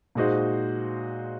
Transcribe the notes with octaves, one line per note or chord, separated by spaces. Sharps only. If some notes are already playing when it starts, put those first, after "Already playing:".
A#2 G#3 D#4 F#4 C5